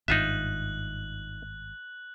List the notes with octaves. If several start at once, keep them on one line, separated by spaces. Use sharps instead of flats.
G#1 G2 D#4 F4 E5 F#6 F#7